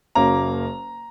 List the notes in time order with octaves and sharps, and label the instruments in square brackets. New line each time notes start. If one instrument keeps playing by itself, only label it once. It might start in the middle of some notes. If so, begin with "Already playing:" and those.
[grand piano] F#1 F#2 F#3 A#3 C#4 A#5